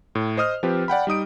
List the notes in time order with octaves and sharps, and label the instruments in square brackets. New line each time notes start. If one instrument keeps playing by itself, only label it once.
[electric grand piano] A2
C5 D#5 D#6 F6
F3 C4 G4 B4
D5 F#5 G5 B5
G3 D#4 D#6 D7